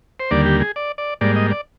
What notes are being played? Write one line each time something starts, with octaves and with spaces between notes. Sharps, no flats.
C5
D#2 D3 G3 A#3 D5
G4
G#4
D5
D5
G#2 G3 A#3 D5
D#5
D5